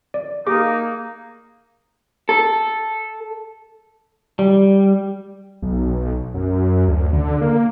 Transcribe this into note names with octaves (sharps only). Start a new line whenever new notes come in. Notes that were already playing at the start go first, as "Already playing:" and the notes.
D5
A#3 D#4 G4 G#4 D6
A4
G3
B1
F#2
D2
D3
A#3